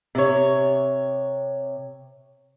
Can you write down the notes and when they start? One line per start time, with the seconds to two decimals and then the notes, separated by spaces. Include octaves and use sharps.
0.15 C3 C#5